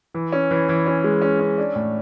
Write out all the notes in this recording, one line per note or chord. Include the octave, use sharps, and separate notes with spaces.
E3
C#4
E3
E3
C#4
G#3
C#4
C#4
D4
A2